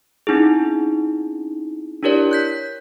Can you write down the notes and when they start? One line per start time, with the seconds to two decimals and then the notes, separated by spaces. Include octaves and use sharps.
0.27 C4 C#4 D#4 E4 G#4
2.03 D4 E4 G4 A#4 C#5 D5
2.31 F#6 G6 B6